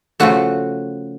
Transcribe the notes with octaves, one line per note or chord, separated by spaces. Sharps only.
C#3 F3 A3 F#4